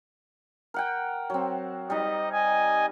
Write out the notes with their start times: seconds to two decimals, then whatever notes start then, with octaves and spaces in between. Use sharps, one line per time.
0.74 A#4 F#5 G5
1.30 F#3 C4
1.90 G3 D#4 D#5
2.32 D#5 G#5